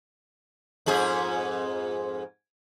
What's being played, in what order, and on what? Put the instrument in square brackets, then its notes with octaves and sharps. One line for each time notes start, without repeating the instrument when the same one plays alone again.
[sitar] F2 G#2 G#4